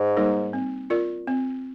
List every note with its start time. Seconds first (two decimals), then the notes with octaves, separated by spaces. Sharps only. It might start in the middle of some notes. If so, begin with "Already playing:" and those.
Already playing: G#2
0.16 G3 A#3 D#4 A#4
0.53 C4
0.90 F4 A#4 D5
1.27 C4